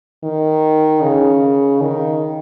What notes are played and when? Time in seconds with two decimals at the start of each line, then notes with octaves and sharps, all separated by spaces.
0.24 D#3
1.02 C#3
1.81 D#3